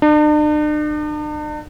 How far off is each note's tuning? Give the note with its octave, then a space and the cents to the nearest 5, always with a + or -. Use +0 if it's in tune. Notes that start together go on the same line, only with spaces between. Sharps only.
D4 +45